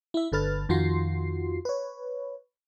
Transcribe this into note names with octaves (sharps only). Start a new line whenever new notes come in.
E4 E5
G1 D3 A4 B4 F6 A6
F2 D#3 F4 F#4 C6 C7
B4 C#5